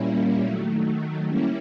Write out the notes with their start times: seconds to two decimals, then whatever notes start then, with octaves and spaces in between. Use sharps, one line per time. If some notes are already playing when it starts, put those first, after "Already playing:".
Already playing: A#2 G3 A#3 C#4 E4
0.44 D#3 F#3 A3
1.27 G3 A#3 C#4 E4